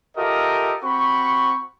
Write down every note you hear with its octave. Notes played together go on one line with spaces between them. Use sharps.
F4 G4 A4 A#4 D#5 E5
C4 F#4 B5 C#6